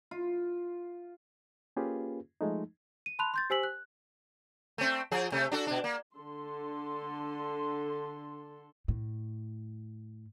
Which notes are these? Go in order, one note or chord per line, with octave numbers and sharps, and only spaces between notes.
F4
A#3 C#4 F4 G4 G#4 B4
F3 G#3 A3 D#4
D#7
A5 B5 C6 F#6 F7
C6 G6 A6
G4 C5 G#5 E6 B6 F#7
F#6
A3 C4
F3 G#4
C3 A3
D4 F#4 A4
B2 D4
A#3
D3 A4 C6
A2